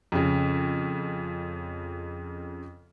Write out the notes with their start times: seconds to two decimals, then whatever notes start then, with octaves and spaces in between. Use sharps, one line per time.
0.12 F2 C#3